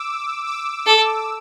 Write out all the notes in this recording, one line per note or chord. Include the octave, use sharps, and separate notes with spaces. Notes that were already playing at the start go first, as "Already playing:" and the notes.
Already playing: D6 E6
D6 E6
A4